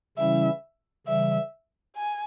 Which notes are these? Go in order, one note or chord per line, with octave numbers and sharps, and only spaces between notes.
C#3 E3 G3 C#4 E4 E5
C#3 E3 G3 E5
G#5